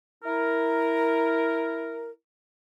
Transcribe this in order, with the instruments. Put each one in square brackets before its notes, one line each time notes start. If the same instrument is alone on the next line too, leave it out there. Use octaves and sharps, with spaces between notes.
[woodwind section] E4 A#4